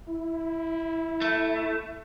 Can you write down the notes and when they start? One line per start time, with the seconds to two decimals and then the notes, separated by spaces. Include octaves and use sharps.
0.07 E4
1.22 A3